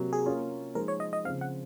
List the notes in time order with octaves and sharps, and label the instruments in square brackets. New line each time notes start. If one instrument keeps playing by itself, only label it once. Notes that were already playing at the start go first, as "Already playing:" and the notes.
Already playing: [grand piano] C3 F#3 A#3
[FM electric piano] G#4
[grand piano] A#3 C#4 F4
[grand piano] F3 G#3 D#4 G#4 C5 [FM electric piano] A#4
[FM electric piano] C#5
D#5
D#5
[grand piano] C#3 F3 C4 [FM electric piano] F5
[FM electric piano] F#5